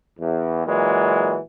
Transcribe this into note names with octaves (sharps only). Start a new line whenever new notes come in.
E2
A#2 E3 F#3 G#3